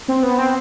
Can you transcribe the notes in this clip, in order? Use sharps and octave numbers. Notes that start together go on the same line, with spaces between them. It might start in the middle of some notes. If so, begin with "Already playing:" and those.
C4
B3
C4